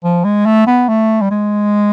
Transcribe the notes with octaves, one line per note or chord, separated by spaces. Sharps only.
F3
G#3
A3
B3
A3
G3
G#3